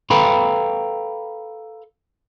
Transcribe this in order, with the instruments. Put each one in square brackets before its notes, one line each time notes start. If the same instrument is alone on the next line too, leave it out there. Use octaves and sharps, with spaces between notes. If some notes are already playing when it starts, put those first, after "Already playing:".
[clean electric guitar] A4 B4 F5 G5 A#5 B5